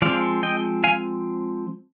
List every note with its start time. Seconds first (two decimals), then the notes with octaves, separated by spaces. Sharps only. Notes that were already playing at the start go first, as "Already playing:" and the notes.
0.02 F3 G#3 C4 D5 F5
0.43 D#5 G5
0.84 F5 G#5